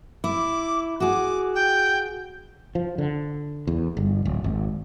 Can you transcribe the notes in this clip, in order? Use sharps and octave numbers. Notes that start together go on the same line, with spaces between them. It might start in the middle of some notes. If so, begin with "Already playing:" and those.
E4 D6
F#4 G#4 D6
G5
F3
D3
E2
G1
D1
G#1